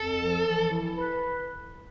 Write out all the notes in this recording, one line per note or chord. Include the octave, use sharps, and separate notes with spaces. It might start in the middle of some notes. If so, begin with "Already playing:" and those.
Already playing: F2 A4
F3
E3
E4
B4